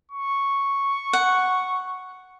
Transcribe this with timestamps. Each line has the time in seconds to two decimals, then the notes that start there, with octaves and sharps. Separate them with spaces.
0.11 C#6
1.13 F#5